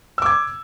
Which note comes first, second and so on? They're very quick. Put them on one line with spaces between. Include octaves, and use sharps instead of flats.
E6 D6 G#6